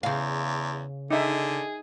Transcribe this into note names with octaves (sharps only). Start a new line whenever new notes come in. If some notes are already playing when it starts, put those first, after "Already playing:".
E2 C#3 F5
D3 D#4 G#4 E5